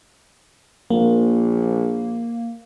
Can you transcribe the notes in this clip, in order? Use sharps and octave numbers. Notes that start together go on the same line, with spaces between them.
A#1 A#3